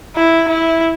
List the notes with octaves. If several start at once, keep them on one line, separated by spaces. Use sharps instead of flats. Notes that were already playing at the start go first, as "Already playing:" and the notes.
E4
E4